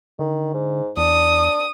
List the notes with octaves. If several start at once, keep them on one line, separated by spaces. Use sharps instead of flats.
D3 D#3
G#2
E2 D4 D#6